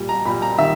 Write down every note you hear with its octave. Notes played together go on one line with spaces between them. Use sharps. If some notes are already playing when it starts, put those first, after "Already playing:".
Already playing: A#2 G3
A#5
A#2 G3 B5
A#5
D#3 G3 E5